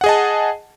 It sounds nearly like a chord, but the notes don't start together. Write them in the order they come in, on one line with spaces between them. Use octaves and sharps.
F#5 G#4 D#5 A5